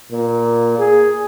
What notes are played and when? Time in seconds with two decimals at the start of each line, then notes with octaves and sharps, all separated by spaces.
0.12 A#2
0.78 G#4